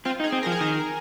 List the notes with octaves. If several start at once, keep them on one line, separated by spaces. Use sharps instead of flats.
C4 F4
D#4
G#4
C4
A#4
F3
G#4
D#3 A#4